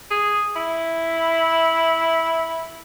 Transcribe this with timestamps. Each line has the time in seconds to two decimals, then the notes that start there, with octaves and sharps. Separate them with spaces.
0.11 G#4
0.56 E4